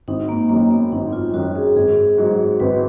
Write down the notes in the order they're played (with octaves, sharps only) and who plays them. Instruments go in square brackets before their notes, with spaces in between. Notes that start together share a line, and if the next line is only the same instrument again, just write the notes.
[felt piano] G#1 [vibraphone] D#4
[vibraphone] A#3
[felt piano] F#2 D#3 [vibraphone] A#3
[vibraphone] B3
[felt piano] G#1 [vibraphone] D#4
[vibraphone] F4
[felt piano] F#2 D#3 [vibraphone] F#4
[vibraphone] G#4
[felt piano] G#1 [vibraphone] G#4
[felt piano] G#2 F#3
[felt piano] G#1 [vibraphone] B4